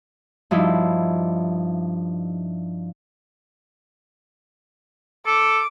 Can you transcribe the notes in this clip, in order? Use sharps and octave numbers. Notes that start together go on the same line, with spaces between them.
G2 F3 D#4 E4
A4 D6